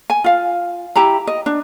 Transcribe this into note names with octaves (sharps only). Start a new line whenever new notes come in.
G#5
F4 F5
E4 G4 A#5 B5
D#5
D4